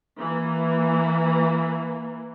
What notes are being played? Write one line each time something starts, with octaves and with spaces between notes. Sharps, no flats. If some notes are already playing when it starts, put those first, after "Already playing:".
E3 A#3